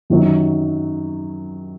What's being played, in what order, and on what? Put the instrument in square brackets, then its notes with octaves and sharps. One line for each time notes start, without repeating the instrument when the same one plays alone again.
[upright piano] F#2 D#3 F#3